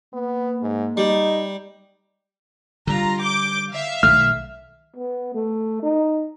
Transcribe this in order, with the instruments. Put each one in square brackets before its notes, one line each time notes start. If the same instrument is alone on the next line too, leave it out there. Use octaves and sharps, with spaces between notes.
[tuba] A#3 [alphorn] B3
[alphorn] G#2
[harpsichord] G3 [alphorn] D#4
[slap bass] D3 G3 [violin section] F4 A#5
[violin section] D6 G6 D7
E5 F5
[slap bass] B1 D#3 A3 [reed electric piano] F6
[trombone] B3
A3
D#4